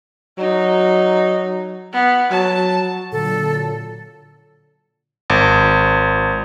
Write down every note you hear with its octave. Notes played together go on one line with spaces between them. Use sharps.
F#3 D#4
B3
F#3 A5
A#2 D3 F#3 A4
G#1